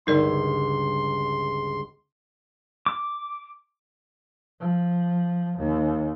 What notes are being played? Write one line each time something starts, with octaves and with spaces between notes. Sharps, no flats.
G1 C#2 D#4 A#4 D5 C6
D6
F3
D#2